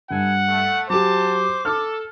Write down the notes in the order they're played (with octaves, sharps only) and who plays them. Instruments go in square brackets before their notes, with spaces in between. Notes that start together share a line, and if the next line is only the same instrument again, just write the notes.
[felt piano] G2 [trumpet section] E4 A4 G#5 [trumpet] F#5
[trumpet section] A3
[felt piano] F#3 G4 [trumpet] C5 [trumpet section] F#5 G#5 A5 [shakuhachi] D6
[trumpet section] A4 [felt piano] F6